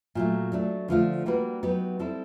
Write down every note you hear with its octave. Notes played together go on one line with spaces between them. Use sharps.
A#2 F#3 A3
F#3 A3 D4
D3 F3 A3 D4 F4
G3 A#3 D4 F#4 B4
F#3 B3 D#4 G4 B4
G3 C4 E4 A4